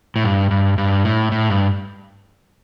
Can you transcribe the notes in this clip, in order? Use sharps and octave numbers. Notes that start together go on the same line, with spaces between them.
A2
G2
G2
G2
A2
A2
G2